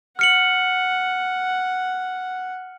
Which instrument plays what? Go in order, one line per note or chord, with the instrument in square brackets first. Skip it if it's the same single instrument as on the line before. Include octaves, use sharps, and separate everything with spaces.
[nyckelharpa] F#5 [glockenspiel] F6 C#7 F#7